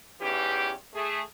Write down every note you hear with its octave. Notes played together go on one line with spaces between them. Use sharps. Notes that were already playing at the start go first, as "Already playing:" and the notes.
E2 G#2 E3 C#4 G4
A3 G#4